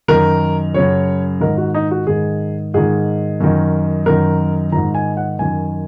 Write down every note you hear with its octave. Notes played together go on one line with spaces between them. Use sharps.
F#2 D#3 A#4
F#2 C#3 C#5
G#2 D#3 A#4
F#4
D#4
F#4
G#2 D#3 G#4
G#2 D#3 G#4
F#2 D#3
F#2 D#3 A#4
G#2 D#3 A#5
G#5
F#5
F#2 D#3 G#5